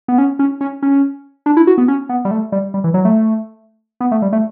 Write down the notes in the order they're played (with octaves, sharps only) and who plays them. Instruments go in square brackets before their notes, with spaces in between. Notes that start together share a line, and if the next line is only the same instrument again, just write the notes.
[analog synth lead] B3
C#4
C#4
C#4
C#4
D4
E4
F#4
B3
C#4
B3
G3
A3
G3
G3
E3
F#3
A3
B3
A3
G3
A3